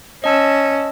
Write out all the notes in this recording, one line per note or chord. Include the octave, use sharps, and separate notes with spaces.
C#4 D#5 A5 E6